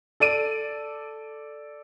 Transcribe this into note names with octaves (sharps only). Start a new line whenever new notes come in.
A4 D5 D7 D#7